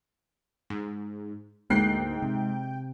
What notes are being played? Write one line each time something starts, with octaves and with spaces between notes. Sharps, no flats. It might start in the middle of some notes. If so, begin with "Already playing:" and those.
G#2
D2 G#2 G#3 A#3 G5 F#6 C7
C3